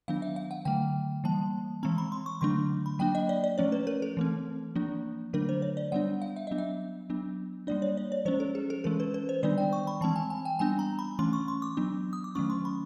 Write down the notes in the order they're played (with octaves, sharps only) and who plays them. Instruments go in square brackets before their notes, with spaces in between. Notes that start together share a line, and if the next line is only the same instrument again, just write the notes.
[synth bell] D#3 F#3 B3 D4 F5
E5
F5
F#5
D3 F#3 A3 G5
E3 G3 A#3 A5
E3 G#3 C4 A#5
B5
C6
C#6
D3 F#3 A3 D4 C6
B5
F#3 A#3 D4 G5
D#5
D5
D5
F3 A3 C#4 C#5
B4
A#4
A4
E3 A3 C4
F3 A#3 D4
D3 F#3 A3 D4 A#4
C5
C#5
D5
G3 B3 D4 F#5
F5
E5
F#3 B3 D4 D#5
E5
F#3 B3 D4
G3 A#3 D4 D5
C#5
D5
C#5
F3 G#3 C#4 C5
A4
G#4
A4
E3 G#3 C#4 A#4
B4
B4
C5
D#3 G3 B3 D4 D5
G5
C#6
B5
E3 G#3 C4 A5
G#5
G#5
G5
G3 B3 D4 G#5
A#5
B5
E3 A3 C#4 C6
C#6
C6
D6
F#3 B3 D4
D#6
D6
D#3 F#3 A3 C#4 C#6
C6
B5